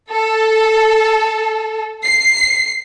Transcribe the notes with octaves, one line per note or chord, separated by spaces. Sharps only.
A4
C7